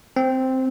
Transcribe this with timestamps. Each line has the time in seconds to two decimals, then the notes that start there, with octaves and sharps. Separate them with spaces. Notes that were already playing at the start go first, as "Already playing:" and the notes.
0.16 C4